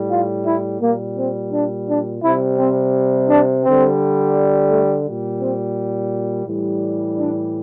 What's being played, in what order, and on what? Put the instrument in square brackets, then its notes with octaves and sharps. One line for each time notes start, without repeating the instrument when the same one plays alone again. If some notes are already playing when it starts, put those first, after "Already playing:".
Already playing: [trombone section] A2 G3
F4
E4
A#2 G3 A#3
C4
D4
D4
C3 G3 E4
C4
D4
D3 G3 C4
A3
A#2 G3
C4
A2 E3 G3
D4